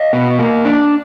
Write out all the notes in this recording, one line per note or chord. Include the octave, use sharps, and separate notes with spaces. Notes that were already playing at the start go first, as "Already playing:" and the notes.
Already playing: D#5 F5
B2
A#3
D4